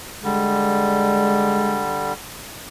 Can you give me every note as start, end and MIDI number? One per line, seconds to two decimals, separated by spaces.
0.24 2.13 50
0.24 2.13 55
0.24 1.83 56